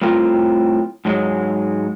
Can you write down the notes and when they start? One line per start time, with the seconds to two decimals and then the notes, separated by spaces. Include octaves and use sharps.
0.02 A2 G3 C4 F4 A#4
1.05 G#2 F#3 G#3